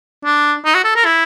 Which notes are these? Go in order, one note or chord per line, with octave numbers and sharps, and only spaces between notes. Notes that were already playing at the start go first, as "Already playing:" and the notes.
D4
D#4
F#4
A4
A#4
E4